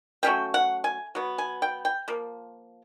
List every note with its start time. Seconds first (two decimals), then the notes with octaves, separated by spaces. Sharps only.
0.23 F#3 A3 C#4 F4 G5
0.54 F#5
0.84 G#5
1.15 F#3 B3
1.38 G#5
1.62 G5
1.85 G5
2.08 F3 A#3